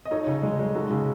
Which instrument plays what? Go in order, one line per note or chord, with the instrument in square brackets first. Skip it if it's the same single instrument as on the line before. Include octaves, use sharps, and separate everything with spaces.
[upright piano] D#5
[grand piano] D#4 [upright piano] A4 C#5
[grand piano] C#3
G#3
G#3
[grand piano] D#4 [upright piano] F#4 A4
[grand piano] C#3